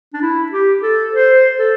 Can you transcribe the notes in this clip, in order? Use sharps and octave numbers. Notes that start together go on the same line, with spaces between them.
D4
E4
G4
A4
C5
A4